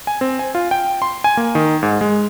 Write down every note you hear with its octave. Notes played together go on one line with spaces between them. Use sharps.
G#5
C4
G#5
F4
G5
C6
G#5
A#3
D#3
G#2
G#3